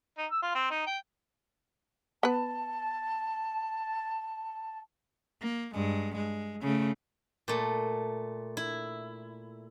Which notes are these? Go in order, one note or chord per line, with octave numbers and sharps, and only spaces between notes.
D#4
E6
F4
C4
D#4
G5
B3 B4 A5
A#3
G2 G#3
G#3
C#3 A3
A#2 A3
E4